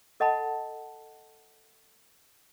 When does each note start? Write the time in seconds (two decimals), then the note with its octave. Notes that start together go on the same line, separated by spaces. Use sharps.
0.20 A4 D#5 F#5 A5 B5